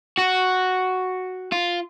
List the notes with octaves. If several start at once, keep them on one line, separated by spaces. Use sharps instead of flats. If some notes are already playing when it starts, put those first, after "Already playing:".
F#4
F4